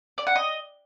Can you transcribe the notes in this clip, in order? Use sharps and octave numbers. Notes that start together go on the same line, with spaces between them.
D5
F#5
D#5